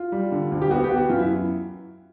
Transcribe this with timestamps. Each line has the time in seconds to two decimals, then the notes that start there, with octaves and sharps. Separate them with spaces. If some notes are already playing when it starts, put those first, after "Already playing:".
Already playing: F4
0.12 G3
0.32 D3
0.52 D2
0.62 G4
0.71 B3 F#4
0.84 G4
0.91 B3
0.97 F#4
1.09 F#2 F4
1.19 E4